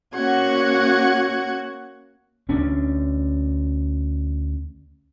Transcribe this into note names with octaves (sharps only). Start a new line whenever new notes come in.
A#3 C#4 F#4 F#5 C#6 G#6
D2 C#4 D4